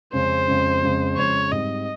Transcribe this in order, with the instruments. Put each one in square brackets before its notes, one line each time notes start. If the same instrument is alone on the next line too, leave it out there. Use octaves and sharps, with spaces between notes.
[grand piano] F2 C#3 G#3 C#4 [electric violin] C5
[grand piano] F2 C#3 G#3 C#4
F2 C#3 G#3 C#4
[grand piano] F2 C#3 G#3 C#4 [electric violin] C#5
[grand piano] G#2 G3 C4 G4 [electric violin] D#5